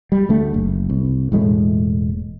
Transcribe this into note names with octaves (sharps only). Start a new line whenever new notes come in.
G3
D2 A3
F#1
C2
E1 A2 G#3 A3